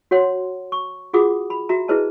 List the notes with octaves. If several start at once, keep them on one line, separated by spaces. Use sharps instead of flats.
F#4 C#5 F#5 C6
C#6
F4 F#4 G#4 F#5 D6 D#6
B5
F#4 E5 A#5
E4 G#4 B4 C5 D#5 A5